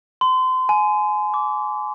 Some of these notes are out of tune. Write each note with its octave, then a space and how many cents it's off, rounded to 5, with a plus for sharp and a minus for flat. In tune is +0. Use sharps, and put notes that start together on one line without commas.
C6 -30
G#5 +25
D6 -30